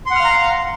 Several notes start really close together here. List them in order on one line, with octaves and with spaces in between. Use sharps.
C6 F#5 F6 F5 A#5